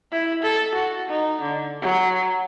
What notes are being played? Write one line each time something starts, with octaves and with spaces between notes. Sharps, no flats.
E4
A4
F#4
D#4
D3
F#3